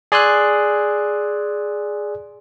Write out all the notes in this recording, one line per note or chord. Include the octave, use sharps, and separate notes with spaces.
G#4 D5 G#5 C6 E6 F#6